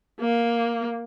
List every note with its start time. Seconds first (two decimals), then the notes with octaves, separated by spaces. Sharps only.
0.20 A#3